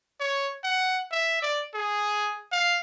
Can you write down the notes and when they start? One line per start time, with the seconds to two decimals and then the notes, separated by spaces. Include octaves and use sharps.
0.20 C#5
0.64 F#5
1.11 E5
1.42 D5
1.74 G#4
2.52 F5